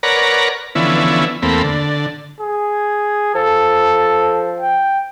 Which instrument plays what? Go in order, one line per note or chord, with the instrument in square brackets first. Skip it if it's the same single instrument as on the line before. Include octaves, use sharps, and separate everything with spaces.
[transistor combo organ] A#4 B4 C#5 D5 F#5 A#5
D3 E3 F3 B3 C#4 E4
E2 A3 A#3 C4 B5
D3
[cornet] G#4
[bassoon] F3 [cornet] A4
[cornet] G5